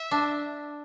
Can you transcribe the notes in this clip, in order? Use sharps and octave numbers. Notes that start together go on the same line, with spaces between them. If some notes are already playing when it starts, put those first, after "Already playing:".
Already playing: E5
D4